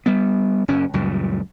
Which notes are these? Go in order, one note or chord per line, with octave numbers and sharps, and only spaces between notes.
G3 B3
F#1 F#2 C#4
C#2 F#2 A#2 G3